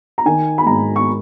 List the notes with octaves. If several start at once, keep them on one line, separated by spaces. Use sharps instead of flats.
A#5
D#3 G#5
B5
G#2 A#5
C#6